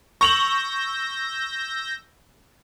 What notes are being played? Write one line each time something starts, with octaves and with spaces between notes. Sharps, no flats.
C#6 E6 G6 A#6 F7 F#7